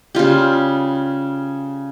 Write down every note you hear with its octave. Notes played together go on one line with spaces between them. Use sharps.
C#3 G3 F4 G4